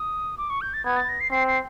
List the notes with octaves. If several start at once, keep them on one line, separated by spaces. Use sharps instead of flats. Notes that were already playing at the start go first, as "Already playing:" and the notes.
Already playing: D#6
D6
C#6
G6
A6
B3 G#6
A6
A#6
C7
C4 C7
C7